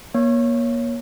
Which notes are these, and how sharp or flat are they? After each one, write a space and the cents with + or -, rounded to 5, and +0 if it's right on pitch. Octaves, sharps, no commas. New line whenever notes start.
A#3 +35 C#5 +0